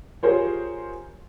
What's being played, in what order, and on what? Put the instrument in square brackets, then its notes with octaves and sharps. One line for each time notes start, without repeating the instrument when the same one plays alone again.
[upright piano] F4 G4 G#4 A#4 C5 C#5